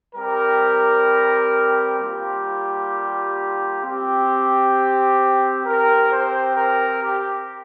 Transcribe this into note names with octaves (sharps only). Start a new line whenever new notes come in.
G3 C4 G4 A#4
G3 A#3 F4 G4
C4 G4
C4 G4 A#4
C5
A#4
G4